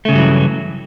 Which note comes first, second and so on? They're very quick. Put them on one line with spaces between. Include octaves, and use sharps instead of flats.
A3 C#3 G2 F#3 E3